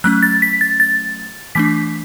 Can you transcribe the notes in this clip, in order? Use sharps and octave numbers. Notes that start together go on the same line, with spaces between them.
F#3 A3 C#4 F#6
A6
B6
A6
A6
E3 A3 D4 B6